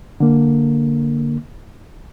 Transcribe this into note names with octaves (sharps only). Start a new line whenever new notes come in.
D3 A#3